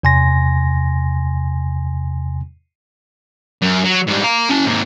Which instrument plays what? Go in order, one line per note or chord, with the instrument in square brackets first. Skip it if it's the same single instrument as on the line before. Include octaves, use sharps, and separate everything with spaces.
[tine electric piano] E2 C3 G#5 C6 A#6
[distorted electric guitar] F#2
F#3
G#2 G3
F5 A#5
C#4 A5
G#2 A#3